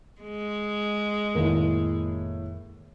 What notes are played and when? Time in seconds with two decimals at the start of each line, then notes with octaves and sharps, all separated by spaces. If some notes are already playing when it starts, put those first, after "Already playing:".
0.21 G#3
1.35 F1 A2 D#3 A#3